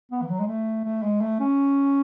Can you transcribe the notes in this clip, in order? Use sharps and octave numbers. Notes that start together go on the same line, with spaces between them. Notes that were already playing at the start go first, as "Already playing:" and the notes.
B3
E3
F#3
G#3
A3
A3
G#3
A3
C#4